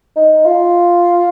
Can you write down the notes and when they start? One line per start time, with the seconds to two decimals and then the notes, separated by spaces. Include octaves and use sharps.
0.16 D#4
0.45 F4